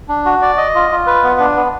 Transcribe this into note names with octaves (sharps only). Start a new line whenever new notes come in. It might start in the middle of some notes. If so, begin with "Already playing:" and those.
D4
F#4
D5
D#5
F4
F4
B4
B3
D4
B3